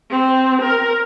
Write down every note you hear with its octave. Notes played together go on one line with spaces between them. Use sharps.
C4
A#4